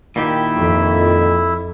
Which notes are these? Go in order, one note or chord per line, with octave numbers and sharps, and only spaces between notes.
A#2 D#3 E4 G4 E5 E6
F2